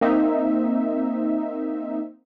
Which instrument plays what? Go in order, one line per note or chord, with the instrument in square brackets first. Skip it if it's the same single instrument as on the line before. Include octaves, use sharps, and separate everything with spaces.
[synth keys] A#3 C4 D#4 E5